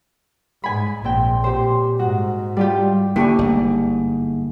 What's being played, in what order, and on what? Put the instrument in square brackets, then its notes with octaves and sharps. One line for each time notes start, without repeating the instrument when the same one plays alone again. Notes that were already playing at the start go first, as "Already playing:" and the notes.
[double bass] G#2 [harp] G#5 B5
[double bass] A#1 [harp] C4 G5
[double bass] A#2 [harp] G4 C5
[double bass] G#2 [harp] F#4
[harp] G3 F4 G4
[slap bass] D3 [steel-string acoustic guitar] A3 D4 G#5 [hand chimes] A#3 [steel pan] E4 G4 C#6
[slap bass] G1 [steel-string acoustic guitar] G#2